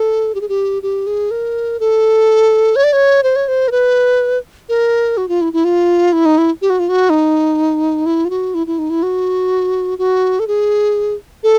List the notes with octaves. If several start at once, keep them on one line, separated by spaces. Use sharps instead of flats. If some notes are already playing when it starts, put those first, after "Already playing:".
Already playing: A4
G4
G#4
G4
G4
G#4
A#4
A4
C#5
D5
C#5
C5
C#5
C5
A#4
B4
A#4
F#4
F4
E4
E4
F4
E4
D#4
E4
G4
F#4
F4
F#4
D#4
E4
F4
F#4
E4
E4
D#4
E4
F#4
F#4
A4
G#4
A4